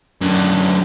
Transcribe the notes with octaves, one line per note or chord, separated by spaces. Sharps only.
F#2 D3